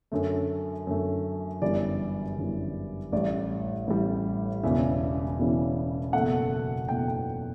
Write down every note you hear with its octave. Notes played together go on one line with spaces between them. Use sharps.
F#2 D3 A3
F#2 D3 A3
G1 F#2 E3 G3 D5
G1 F#2 E3 G3
A1 A2 G3 D5
A1 A2 G3
E1 E2 C#3 E3 E5
E1 E2 C#3 E3
F#1 E2 B2 A3 F#5
F#1 E2 B2 A3 G5
G5